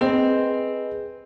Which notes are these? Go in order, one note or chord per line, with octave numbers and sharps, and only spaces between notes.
C4 G#4 B4 D#5